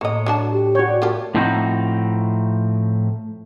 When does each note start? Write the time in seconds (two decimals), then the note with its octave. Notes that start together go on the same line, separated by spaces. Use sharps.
0.01 A2 A#3 C#5 D#5
0.26 F#3 D4 A5
0.52 G4
0.75 F#4 C#5 G5 C#6
0.87 D5 D6
1.02 A3 F4 G4 A#4
1.35 A2 F3 C4 D#4 F4 F#4